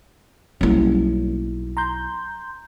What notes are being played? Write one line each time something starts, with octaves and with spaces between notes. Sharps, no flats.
B1 G3 A#3 C#4 E4
A#5 C6 G6